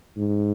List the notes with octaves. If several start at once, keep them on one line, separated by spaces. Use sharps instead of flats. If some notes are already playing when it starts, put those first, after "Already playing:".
G#2